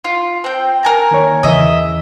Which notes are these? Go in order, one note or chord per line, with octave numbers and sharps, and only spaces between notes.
F4
C4 G5
A#4 G#5 A#5
D#3 A#3 C#5
E2 C#3 E3 D#5 E5